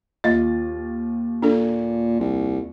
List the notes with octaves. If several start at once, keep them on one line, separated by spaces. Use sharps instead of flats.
D#2 F4 D#5 A6
A#2 D4 A4
C2